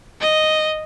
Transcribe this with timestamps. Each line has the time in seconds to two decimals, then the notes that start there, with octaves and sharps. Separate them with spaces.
0.21 D#5